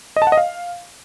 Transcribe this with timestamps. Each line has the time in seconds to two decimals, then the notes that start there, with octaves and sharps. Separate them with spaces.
0.16 D#5
0.22 A5
0.27 F#5
0.32 D#5
0.37 F5